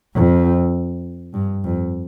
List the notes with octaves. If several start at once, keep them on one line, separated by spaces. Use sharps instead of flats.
F2
G2
F2